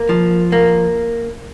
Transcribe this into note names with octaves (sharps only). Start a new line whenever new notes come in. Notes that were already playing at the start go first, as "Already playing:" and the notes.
Already playing: A#3
F3
A#3